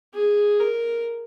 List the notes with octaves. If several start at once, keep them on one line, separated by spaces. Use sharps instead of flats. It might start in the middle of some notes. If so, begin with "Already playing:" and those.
G#4
A#4